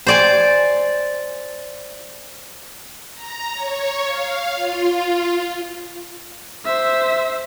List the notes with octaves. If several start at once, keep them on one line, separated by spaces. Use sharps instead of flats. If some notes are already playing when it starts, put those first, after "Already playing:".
C5 D5 G#5
A#5
C#5
F5
F4
C5 E5